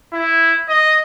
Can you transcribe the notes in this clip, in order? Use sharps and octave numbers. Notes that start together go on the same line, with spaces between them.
E4
D#5